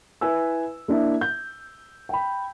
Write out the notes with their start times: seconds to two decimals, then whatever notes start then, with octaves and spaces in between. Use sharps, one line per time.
0.21 E4 B4 G#5 E6
0.88 A#3 D4 E4
1.21 G6
2.09 G5 B5